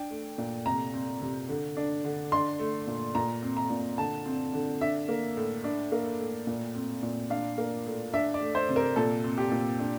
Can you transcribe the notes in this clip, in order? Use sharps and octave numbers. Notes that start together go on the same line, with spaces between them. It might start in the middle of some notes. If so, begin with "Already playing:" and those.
Already playing: D4 G5
A3
A#2
C3 A#5
C4
C3
D3
D4
D3
D4 C6
A3
A#2
A#2 A#5
C4
A#5
A#2
D3 A5
C4
D3
D4 E5
A#3
A2
D4
A#3
A2
A#2
C4
A#2
D4 F5
A#3
A2
D4 E5
D5
A3
C5
C3
A#4
A#2 A4
C4
G4
A#2
D4